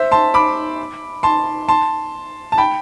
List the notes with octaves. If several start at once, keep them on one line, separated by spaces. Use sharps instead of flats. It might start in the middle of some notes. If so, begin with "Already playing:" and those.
Already playing: C5 E5
A5 C6
B5 D6
A5 C6
A5 C6
A5
G5 B5